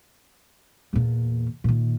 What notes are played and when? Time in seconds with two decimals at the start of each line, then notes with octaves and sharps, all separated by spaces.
0.93 E2 A#2
1.64 A#2 D#3